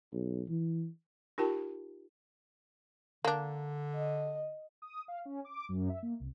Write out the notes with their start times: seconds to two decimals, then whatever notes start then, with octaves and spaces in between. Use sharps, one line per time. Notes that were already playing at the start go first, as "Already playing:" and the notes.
0.13 B1
0.49 E3
1.38 D#4 F4 G4 A#4 G5 A5
3.25 D3 A#3 D4
3.95 D#5
4.82 D#6
5.08 F5
5.25 C#4
5.45 D6
5.69 F#2
5.90 E5
6.03 A#3
6.20 C2